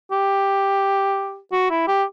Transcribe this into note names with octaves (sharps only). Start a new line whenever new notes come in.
G4
F#4
E4
G4